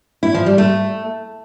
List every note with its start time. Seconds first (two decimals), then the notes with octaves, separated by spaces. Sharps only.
0.23 E4
0.34 F3
0.46 G3
0.58 A3